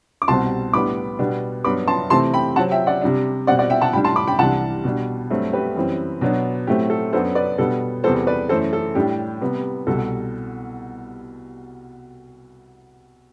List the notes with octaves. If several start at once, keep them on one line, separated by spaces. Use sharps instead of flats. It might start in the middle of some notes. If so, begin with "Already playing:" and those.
D6
C2 B2 G3 C4 A5 C6
A2 G3 B3 D4 B5 D6
B2 G3 B3 D4
G2 F#3 B3 B5 D6
A5 C6
C3 E3 A3 C4 A5 C6
G5 B5
C3 F#3 C4 F#5 A5
E5 G5
D5 F#5
C3 G3 D4
B2 G3 C4 D5 F#5
D5 F#5
E5 G5
F#5 A5
A2 G3 D4 G5 B5
A5 C6
B5 D6
G5 B5
C2 C3 E3 G3 D4 F#5 A5
B2 G3 D4
G2 F#3 A3 C4
G4 B4
F#2 E3 G3 C4
B2 F#3 B3 D4
A2 F#3 A3 C4 G4
A4
F#2 F#3 B3 D4 A4 C5
B4 D5
B2 G3 B3 D4 A4
E2 C3 G3 B3 A4 C5
B4 D5
F#2 E3 A3 A4 C5
A4
A2 G3 D4 G4
C3 G3 B3
C2 B2 G3 A4